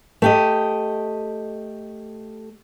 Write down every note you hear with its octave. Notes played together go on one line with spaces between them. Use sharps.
A3 G4 D#5